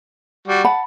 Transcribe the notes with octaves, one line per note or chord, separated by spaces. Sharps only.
G3 F#4
F#5 A5 B5